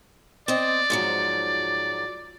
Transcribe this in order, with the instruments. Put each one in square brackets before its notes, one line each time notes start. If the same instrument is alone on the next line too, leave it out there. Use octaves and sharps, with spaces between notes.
[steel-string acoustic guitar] C4 D#5 [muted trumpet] D5
[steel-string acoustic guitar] G#2 F3 F#3